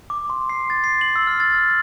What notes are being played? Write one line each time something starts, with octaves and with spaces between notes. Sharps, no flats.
D6
C6
C7
A6
C7
F#7
E6
F6
A6
F6